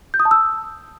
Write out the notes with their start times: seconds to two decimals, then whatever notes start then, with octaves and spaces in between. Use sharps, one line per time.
0.14 G6
0.20 D#6
0.25 A5
0.31 E6